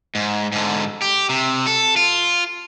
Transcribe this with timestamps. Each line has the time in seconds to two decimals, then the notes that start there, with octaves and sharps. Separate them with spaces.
0.15 G#2
0.52 G#2 D3
1.02 G4
1.29 C3
1.67 A4
1.96 F4